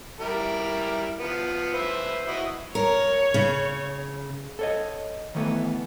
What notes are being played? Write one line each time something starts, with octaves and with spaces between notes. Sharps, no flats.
G3 E4 A#4
F3 B3
B4 C5 E5
E4 F#4 D#5
A#4 C#5
C#3
A4 C#5 D#5
D#3 E3 A3 B3